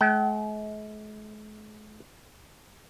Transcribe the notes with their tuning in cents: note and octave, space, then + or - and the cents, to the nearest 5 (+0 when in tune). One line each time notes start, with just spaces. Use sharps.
G#3 +45 G5 -45